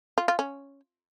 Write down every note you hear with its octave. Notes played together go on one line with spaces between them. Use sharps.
F4
F4
C#4